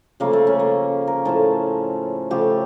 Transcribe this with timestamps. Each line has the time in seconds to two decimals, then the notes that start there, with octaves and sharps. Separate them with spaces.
0.20 C#3 F3 A3 A#3
0.33 A3
0.47 C#4
0.60 A#3
1.08 A#4
1.25 A2 F3 A3 A4
2.31 C#3 F3 A3 G4